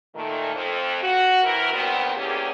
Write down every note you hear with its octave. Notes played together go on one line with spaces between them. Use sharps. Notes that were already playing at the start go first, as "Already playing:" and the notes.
A#2 D#3 A3
F2
F#4
E3 C4 E4 A#4
E2 G2 A#2 D#3 B3 C4
E2 G3 A#3 C#4 G4 G#4